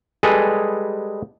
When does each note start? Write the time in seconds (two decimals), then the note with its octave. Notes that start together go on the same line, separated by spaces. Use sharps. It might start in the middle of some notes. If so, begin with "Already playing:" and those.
0.23 G3 G#3 G#4 A4 B4